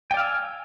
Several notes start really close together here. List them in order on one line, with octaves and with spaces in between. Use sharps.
G5 D5 F5 E6 G#5